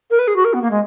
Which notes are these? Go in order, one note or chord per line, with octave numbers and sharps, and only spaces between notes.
A#4
B4
G#4
F#4
A#4
B3
A#3
G#3